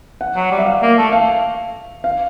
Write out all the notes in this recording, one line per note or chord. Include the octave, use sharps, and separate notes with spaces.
F#5
F#3
G3
E5
F5
A#3
A3
F5
F5